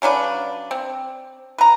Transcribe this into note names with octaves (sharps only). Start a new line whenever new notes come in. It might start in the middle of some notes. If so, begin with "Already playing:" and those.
C#3 F#3 D4 B4
C4
B4 A#5